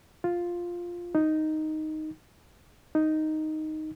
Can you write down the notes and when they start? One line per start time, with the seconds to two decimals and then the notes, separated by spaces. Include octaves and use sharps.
0.24 F4
1.15 D#4
2.95 D#4